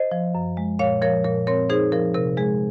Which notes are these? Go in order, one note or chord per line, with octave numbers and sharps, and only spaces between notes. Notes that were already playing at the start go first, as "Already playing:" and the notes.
Already playing: C5 D#5
F3
F#2
G#3
A#2 C#5 F5
F3 A#4 C#5
A#2 A#4
C4 A#4 C#5
D#4 G#4 C5
F3 A#4
C3 A#4
G#3 G#4